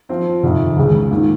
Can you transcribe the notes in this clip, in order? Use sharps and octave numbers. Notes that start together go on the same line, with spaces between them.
F3 C4 F4
F2 C3 D#3
C#2 C#3 G#3
G#2 D#3 A#3